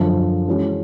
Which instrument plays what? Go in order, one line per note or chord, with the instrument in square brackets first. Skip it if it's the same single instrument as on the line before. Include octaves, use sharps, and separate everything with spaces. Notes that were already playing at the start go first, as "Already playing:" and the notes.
Already playing: [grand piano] F#2 D3 F3
E3 G#3 C#4 F#4